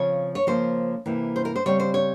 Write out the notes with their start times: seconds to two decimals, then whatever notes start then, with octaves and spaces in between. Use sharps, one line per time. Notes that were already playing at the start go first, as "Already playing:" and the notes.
Already playing: C#3 F3 C4 C#5
0.35 C#5
0.47 C#3 F3 A#3 C5
1.06 C3 E3 A#3
1.36 C5
1.45 A#4
1.56 C5
1.66 C#3 G3 C4 C#5
1.80 C5
1.94 C#5